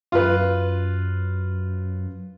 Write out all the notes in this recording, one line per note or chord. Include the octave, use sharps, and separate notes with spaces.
F#2 F4 B4